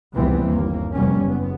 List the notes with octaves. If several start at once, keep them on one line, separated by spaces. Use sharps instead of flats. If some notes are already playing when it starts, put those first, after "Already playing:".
F1 C#2 E3 G3 B3 C4
G1 D#2 A#3
F1 E2 G3 A#3 C#4
F#1 B3